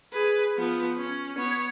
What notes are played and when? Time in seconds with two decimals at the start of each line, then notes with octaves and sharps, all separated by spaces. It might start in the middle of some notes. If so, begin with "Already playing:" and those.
0.12 G#4 B4
0.57 F3 B3
0.98 C#4
1.37 B3 C#5